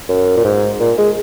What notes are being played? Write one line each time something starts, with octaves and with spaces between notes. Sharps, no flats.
F#2
A#2
G#2
A#2
G#3